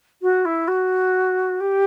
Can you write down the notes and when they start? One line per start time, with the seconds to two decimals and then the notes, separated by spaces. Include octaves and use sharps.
0.22 F#4
0.45 E4
0.68 F#4
1.60 G4